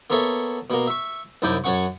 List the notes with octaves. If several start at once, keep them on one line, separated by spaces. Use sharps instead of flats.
A#3 B3 A4 C#5 E5
B2 A#3
E5 C#6
C2 F#2 D#4 E4 G5 D6
F#2 C#4 F#5 C#6